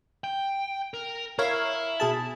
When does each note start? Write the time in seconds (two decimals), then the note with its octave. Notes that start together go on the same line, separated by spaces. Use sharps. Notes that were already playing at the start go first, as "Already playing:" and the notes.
0.24 G5
0.94 A#4
1.39 E4 A#4 C#5 F5
2.00 B2 G#4 A5